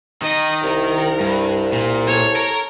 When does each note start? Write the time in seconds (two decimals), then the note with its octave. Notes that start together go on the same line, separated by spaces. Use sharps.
0.22 D#3 D#5
0.64 C2 A#4
1.20 G2
1.72 A#2
2.07 A4 C#5
2.36 A#4